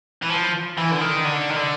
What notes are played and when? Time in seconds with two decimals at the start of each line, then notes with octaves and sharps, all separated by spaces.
0.22 E3
0.30 F3
0.78 E3
0.91 D3
1.01 D#3
1.25 D3
1.50 D#3
1.55 D3